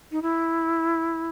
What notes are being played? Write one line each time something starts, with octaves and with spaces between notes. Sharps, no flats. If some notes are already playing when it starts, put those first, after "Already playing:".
D#4
E4